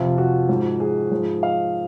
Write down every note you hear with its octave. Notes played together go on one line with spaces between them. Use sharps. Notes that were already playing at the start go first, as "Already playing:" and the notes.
Already playing: F2 C3 F3 F4
F#4
G#2 F3
G#4
G#2 F3
F5